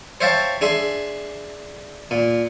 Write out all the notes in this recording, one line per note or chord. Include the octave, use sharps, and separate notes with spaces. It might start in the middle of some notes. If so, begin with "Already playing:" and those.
C5 C#5 E5 F5 G5 A5
D4 G#4 E5 C6
A#2